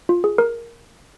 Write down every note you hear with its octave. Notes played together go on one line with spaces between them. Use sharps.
F4
G#4
A#4